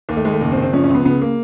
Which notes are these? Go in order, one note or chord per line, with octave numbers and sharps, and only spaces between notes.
D#2 A#3
A3
D#2 G#3
A3
F#1 A#3
C4
F#1
C4
F3 C#4
C#4
C#2
B3
C#3 B3
A#3